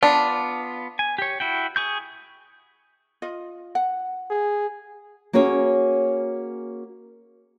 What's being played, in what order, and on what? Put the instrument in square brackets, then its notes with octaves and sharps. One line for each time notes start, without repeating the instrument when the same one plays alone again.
[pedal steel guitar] B3 F4 [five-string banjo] D4
[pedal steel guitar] G#5
G4 C#5
E4 F#4 G5
G#4 C#6 G6
[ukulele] F4 D#5
F#5
[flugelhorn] G#4
[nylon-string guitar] A#3 C#4 F#4 G#4 C#5